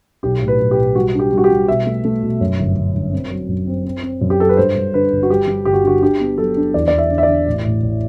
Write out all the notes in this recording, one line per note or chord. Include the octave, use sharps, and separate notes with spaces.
B1 G4
A2
B4
B1
G4
B1
G3 F#4
D4
G4
G3
F#4
G4
G3
B2 E5
A3
A3
B2
F#2
G1
G1
G1
C4
F#3
F#2
C4
C4
C4
F#2
G4
F#3 A4
B4
G2 C5
G2
D3 B4
G1
F#4
G3 G4
G3
G1 G4
F#4
D3 F#4
D4 G4
B3
F#3 A4
D4
E2 D5
E2 D5
E5
D3
E5
D5
D3
A1
A2
A1